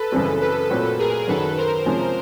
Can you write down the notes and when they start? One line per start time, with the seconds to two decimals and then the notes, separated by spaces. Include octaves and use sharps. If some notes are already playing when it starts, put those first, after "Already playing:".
Already playing: A4 B4
0.12 F#2 C#3 E3 G3 C4
0.41 A4 B4
0.70 A#2 F#3 A3 C4
0.99 G#4 A#4
1.27 F#2 D#3 F#3 A4 B4
1.57 A#4 C5
1.86 C3 F3 G#3 C#4